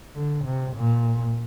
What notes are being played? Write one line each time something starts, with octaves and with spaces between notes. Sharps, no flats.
D3
C3
A#2